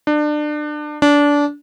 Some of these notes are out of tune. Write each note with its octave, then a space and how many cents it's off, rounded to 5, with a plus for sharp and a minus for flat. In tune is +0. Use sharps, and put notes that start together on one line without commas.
D4 +30
D4 -20